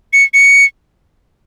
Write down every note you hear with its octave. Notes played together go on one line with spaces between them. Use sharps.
C#7
C#7